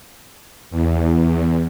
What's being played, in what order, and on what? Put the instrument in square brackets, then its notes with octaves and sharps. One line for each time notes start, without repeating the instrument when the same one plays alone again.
[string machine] E2